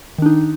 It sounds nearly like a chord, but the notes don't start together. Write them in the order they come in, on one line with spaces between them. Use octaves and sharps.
D#3 D4 D#4